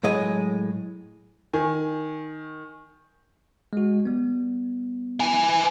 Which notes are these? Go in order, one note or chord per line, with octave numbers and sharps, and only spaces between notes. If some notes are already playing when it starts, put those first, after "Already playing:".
A2 F#3 G#3 D#5
D#3 G#5
G#3 F#4
G3 B3
E4 G#5